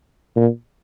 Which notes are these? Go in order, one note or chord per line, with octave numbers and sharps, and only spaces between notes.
A#2